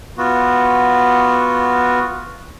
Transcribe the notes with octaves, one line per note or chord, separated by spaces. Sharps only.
B3 F4 F#4